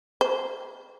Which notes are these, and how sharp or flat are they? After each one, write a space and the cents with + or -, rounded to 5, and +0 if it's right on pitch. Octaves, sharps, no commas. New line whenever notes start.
C5 -10